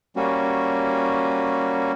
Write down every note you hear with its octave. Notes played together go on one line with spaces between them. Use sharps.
G3 A#3 C#4 F#4